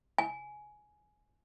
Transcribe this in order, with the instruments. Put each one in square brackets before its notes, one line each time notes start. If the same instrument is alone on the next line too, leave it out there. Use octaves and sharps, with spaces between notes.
[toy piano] G#5